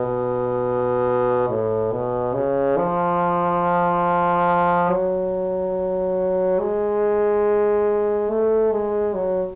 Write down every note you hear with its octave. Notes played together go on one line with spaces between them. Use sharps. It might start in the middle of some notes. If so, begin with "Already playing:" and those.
Already playing: B2
A2
B2
C#3
F3
F#3
G#3
A3
G#3
F#3